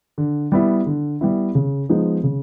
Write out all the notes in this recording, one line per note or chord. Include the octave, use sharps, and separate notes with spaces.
D3
G3 B3 E4
D3
G3 B3 E4
C#3
F3 G#3 B3 D#4
C#3